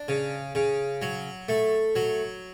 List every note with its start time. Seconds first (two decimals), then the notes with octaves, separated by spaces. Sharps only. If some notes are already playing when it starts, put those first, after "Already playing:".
Already playing: D4
0.08 C#3
0.55 C#3
1.02 F#3
1.49 A3
1.96 F#3